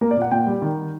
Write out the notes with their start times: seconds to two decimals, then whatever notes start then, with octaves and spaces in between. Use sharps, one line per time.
0.01 A#3 A#4
0.11 D5
0.17 A#2 F#5
0.31 A#2 G5
0.47 G3
0.62 D#3